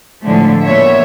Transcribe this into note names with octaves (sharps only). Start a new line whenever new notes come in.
A2 D3 F3 G#3 A3
A#2 E3 B3 C#5 E5